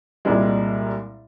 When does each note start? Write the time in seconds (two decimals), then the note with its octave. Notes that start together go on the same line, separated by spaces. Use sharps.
0.25 C2 A#2 G3 G#3